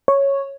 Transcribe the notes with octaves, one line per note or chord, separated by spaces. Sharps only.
C#5